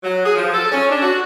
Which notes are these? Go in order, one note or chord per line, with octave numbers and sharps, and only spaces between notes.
F#3
G#4
F3
A4
C#4
D4
F#4